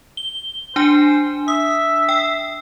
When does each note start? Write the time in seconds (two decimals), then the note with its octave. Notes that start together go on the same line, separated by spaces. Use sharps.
0.17 G7
0.76 D4 C5 G#5
1.48 E5 D#6
2.09 G5